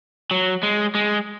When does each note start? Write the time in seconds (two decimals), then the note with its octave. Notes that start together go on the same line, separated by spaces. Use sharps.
0.31 F#3
0.63 G#3
0.95 G#3